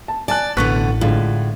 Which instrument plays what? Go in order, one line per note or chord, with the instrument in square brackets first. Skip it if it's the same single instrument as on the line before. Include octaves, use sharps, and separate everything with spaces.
[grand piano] A5
[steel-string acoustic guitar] D5 [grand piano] G#5 A5 F#6
[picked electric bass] A1 [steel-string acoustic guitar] B2 D3 B3 [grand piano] C#6 F#6 B6
[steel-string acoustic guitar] A2 [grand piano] D3 G#3 F4